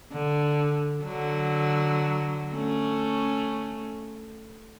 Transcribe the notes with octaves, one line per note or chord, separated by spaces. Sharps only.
D3
D3 F#3
A3 C#4